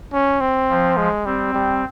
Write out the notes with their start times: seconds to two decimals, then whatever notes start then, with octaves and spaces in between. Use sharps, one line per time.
0.13 C#4
0.41 C4
0.69 F3
0.97 G#3
1.26 G3 C4
1.54 G3